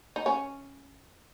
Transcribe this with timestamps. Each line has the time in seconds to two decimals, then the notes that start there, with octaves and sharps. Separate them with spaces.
0.16 D#4
0.26 C#4